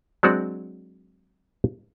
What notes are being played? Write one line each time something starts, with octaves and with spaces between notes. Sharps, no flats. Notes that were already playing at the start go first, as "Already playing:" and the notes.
F#3 G#3 C4 D4 F#4 D5